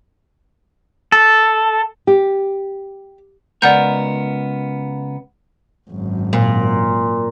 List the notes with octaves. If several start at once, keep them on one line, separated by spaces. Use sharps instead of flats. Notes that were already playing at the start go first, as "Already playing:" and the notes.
A4
G4
C#2 B3 A#4 D5 F#5 G6
G#1 F#2
A#2